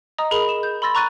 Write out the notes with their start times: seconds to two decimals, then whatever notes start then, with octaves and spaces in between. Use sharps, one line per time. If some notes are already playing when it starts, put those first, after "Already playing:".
0.18 D#5 A#5 D#6
0.31 G#4 A#4 B5 F7 F#7
0.49 E7
0.63 G6
0.82 B5 C6 E6 A6 A#6
0.95 A#5 C#6 F#6 A6 D#7